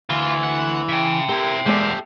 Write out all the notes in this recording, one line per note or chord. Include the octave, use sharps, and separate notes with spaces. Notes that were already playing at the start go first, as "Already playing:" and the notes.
D2 E3 F4
F#5
C#3 E5 G5
C4 E4 G4 A#4
E2 G#3 A#3 G4 A4 D5